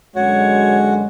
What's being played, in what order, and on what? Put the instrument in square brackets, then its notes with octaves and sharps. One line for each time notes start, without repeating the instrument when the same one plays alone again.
[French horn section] F#2 D3 G#3 [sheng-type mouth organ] F#4 [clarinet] C#5